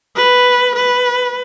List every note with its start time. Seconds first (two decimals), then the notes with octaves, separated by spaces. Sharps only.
0.16 B4
0.76 B4